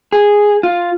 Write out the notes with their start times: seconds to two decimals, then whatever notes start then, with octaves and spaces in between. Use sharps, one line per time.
0.12 G#4
0.63 F4